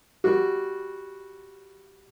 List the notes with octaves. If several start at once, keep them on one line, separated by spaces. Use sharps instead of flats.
G3 F#4